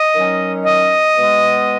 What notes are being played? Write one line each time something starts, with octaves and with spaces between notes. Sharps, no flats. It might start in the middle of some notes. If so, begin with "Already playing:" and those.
Already playing: D#5
D#3 F#3 C#4
D#5
B2 G#3 B3